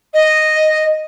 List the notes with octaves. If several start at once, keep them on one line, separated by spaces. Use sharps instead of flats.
D#5